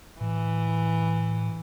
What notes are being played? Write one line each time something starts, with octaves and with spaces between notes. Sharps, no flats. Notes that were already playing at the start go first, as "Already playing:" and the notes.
A2 E3